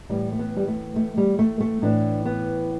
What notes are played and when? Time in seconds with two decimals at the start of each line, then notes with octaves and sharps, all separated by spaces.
0.09 A2 E3 G3
0.32 A3
0.39 B3
0.57 G3
0.68 A3
0.96 A3
1.17 G3
1.39 A3
1.60 A3
1.82 A2 E3 D4
2.25 B3